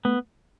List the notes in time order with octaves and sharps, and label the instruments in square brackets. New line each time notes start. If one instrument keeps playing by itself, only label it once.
[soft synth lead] A3 [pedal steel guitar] B3